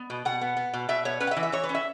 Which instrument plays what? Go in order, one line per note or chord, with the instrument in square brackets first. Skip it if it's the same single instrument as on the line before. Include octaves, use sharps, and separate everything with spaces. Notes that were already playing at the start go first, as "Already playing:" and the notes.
Already playing: [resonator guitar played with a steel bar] B3
B2
B2 F#5
B3
B3
B2
B2 E5
B3 C#5
C#4 B4
F#5
E5
E3
E5
E3 C#5
B4
C#4
E5